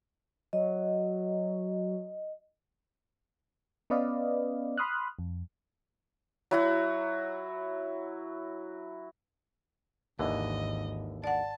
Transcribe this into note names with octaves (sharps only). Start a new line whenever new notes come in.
F#3 D#5
B3 C#4 B4 D5 D#5 F5
B5 C6 D#6 F6 F#6
F2
F#3 E4 F#4
G#1 D#2 D3 E3 D#5
D5 F#5 A5